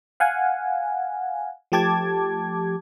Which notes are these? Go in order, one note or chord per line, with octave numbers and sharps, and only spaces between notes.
F5 F#5 G#5
F3 A3 G4 A5 D6 G#6